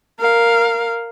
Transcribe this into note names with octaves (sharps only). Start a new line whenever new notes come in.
A#4 F5